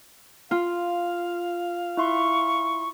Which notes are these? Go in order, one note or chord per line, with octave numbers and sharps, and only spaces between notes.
F4 F5
E4 E5 C6 C#6